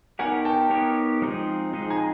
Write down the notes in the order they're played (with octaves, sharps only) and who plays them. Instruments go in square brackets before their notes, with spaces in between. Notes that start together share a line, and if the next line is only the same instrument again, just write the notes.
[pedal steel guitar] B3 D#4 G4 A#4 C#5 [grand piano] F#5 G#5
[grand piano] G5 A5
[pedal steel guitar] B3 D#4 G4 A#4 C#5
F3 G#3 C4 D#4 G#4
F3 G#3 C4 D#4 G#4
[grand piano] G#5 A#5